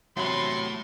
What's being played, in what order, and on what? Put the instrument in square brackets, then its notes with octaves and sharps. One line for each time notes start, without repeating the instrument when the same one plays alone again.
[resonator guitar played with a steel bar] E2 C3 F#3 [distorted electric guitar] A3 B5 [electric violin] C6